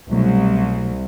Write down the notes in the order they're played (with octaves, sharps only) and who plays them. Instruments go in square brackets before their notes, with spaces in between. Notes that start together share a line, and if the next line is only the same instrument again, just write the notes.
[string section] C2 [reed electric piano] B2 F#3 A3